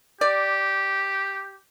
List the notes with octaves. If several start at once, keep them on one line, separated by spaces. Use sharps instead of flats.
G4 D5